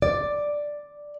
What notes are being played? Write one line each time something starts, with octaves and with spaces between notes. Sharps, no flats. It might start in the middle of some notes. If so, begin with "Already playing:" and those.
D5